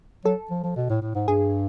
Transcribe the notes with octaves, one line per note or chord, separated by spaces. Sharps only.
F#3 A4
F3
F3
B2
A2
A2
G#2
G2 G#4